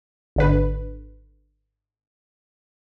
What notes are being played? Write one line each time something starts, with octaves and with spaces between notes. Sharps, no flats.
G#1 D3 B4